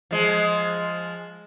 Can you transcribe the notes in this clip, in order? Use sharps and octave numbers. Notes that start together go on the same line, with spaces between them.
F3 G#3